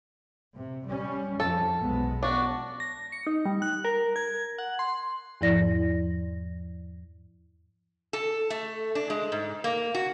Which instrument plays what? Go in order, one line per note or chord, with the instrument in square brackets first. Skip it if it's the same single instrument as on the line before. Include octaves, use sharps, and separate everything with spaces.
[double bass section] C3
G3 C#4
[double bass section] F2 F3 [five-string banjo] A4
[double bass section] B1 G#3 B3
[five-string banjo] D4 F#4
[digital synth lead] A#6
C#7
D#4
G3
F#6
A#4
G#6
F#5
C6
[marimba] E2 G#2 F3 E4 D5 A#6
[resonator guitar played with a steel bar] A4
A3
D4
G#3
G#2
A#3
F#4